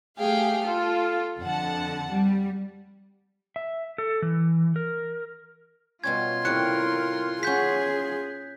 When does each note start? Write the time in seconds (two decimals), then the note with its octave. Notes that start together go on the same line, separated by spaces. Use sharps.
0.19 A3 G4 G#4 F5 G5
0.65 F4 A4
1.41 F2 D3 F#5 A5
2.11 G3
3.56 E5
3.98 A4
4.22 E3
4.76 A#4
6.04 B2 G3 C#4 F4 C6 G#6
6.45 A2 C3 G3 E4 A#4 F#6 C#7
7.43 C#4 G#4 F#5 G6 B6